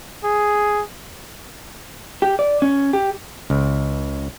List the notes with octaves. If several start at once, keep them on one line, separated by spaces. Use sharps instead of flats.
G#4
G4
D5
C#4
G4
C#2